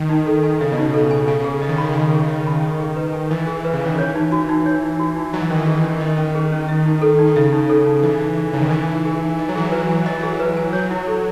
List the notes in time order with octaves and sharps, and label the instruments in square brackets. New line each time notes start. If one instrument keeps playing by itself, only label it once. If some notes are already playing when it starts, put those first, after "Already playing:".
Already playing: [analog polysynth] D#3
[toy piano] D#4
A4
G#5
[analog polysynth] C#3 [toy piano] E5
[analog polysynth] B2
[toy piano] D#4
[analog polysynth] B2 [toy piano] A4
[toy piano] G#5
[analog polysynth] C#3 [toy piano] G#5
[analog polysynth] C#3
[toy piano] G#4
[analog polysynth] C#3 [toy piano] D#5
[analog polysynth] D#3
[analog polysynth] C#3 [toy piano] B5
[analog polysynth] D#3
C#3
[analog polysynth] D#3 [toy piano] G#5
[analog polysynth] C#3
[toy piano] G#4
[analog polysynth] D#3 [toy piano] D#5
[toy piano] B5
D#5
G#4
B4
G#5
[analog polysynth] E3 [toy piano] D#5
[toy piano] G#4
B4
[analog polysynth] C#3
[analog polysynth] D#3 [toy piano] G#5
[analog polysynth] E3 [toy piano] C#5
[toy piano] D#4
F#4
D#4
C#5
D#4
F#4
D#4
[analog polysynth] F#3 [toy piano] D#5
[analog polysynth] E3
[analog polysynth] D#3 [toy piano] C#4
[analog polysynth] E3
[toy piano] G#4
C#4
[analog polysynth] D#3 [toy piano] D#5
[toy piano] C#4
G#4
C#4
E5
D#4
A4
D#4
[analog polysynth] D#3
[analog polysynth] C#3 [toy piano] E5
[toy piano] D#4
A4
D#4
[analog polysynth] E3 [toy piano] D#5
[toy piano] D#4
G#4
[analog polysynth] C#3 [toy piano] D#4
[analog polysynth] D#3
[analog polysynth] E3 [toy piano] D#5
[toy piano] D#4
G#4
D#4
[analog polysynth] E3 [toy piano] D#5
[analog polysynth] F#3
[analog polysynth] E3 [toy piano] G#4
[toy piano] B4
G#5
[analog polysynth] E3 [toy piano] D#5
[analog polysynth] F#3 [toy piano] G#4
[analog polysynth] E3
[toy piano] B4
G#5
[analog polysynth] F#3 [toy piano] C#5
[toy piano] E4
A4